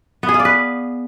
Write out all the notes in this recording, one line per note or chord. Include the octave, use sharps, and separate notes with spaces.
B3
G#4
F5
D5
B4